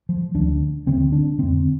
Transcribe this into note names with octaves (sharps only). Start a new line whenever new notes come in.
F3
D2 D3 D4
D2 D3 C4
D4
F2 D3 C4